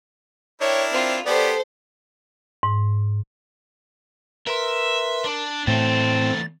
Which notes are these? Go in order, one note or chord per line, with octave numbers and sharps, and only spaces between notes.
D4 E4 A#4 C#5 G5
C4 F4
B3 G4 A4 C5 D5
G#2
A#4 B4 E5 C6
D4
E2 A2 A3 C4 A6